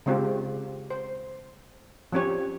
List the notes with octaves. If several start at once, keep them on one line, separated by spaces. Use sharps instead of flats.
C#3 G#3 C4 F4 G4
C5
F3 C4 C#4 G4 C#5